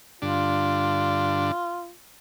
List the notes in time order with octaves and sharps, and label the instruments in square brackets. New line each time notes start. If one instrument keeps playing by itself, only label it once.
[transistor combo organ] G2 D3 D4 [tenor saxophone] F4